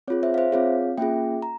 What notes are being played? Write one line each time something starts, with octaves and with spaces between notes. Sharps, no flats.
C4 F4 G#4 C#5
C5 E5
F5
C5 E5
C4 F4 G#4 C#5 F5
A#3 C#4 F4 G#4 E5 G5
A#5